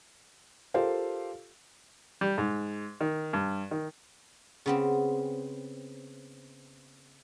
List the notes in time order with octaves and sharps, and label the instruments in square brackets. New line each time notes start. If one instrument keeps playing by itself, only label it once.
[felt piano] F4 G4 A4 A#4 C5 F5
[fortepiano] G3
G#2
D#3
G2
D#3
[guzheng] C#3 B3 C4